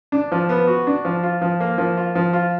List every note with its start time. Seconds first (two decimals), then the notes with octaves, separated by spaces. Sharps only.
0.12 D4
0.32 F3
0.49 B3
0.67 F#4
0.87 D4
1.05 F3
1.23 F4
1.41 F3
1.60 A#3
1.78 F3
1.97 F4
2.15 F3
2.33 F4